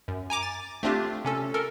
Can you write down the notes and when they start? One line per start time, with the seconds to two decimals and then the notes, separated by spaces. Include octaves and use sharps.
0.08 F#2
0.30 G#5 A#5 D6
0.43 A6
0.83 A3 C4 D4 F4 G4
1.25 C3 C#4 A4
1.54 A4 A#4